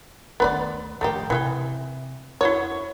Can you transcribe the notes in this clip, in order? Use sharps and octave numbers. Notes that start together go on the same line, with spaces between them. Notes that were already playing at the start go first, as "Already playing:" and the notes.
D2 D#3 B3 B4 D5
A2 F3 A3 A#3 G4
C3 E3 G#4 G5
F2 E4 F#4 C#5